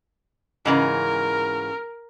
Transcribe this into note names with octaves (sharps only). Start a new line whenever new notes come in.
G#2 C#3 E3 A#4